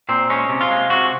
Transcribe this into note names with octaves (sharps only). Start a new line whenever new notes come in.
A#2 C4
G#3 C#4
C3
F4
G#3
C3 F#4